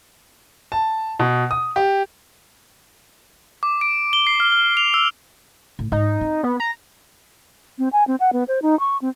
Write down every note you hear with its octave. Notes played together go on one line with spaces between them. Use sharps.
A5
B2
D#6
G4
D6
D7
G7
C7
F6
F6
F7
E6
A2
G#2 D#4
C4
B3
A#5
C4
G#5
C4
F#5
B3
C5
D#4
C#6
C4